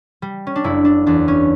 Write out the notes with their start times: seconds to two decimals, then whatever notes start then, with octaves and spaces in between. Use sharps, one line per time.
0.22 G3
0.47 C#4
0.56 D4
0.64 F#1 E4
0.85 D4
1.06 E2 D4
1.28 C#4